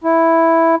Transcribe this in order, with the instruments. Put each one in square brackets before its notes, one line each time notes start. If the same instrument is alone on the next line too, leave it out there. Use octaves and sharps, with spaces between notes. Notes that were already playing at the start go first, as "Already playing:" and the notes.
[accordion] E4